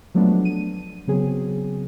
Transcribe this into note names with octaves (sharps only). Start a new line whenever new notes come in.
F3 F#3 G#3 A3 B3 D4
D#7
C#3 F#3 B3 C4 G#4